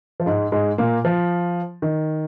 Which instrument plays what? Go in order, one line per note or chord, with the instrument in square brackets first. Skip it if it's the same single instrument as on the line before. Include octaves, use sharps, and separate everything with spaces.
[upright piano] F3
G#2 G#3
G#2 G#3
A#2 A#3
F3
D#3